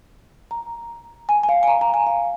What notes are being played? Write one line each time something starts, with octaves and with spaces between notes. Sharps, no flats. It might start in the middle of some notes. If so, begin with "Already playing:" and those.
A#5
G#5
G#5
F5
G#5
A#5
A#5
G#5
F5